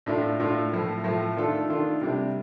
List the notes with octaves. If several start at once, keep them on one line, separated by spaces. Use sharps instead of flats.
A2 A3 D4 F4
A2 A3 D4 F4
A2 F3 A3
A2 F3 A3
D#3 A3 D4 F4 A4
D#3 A3 D4 F4 A4
C3 G3 D4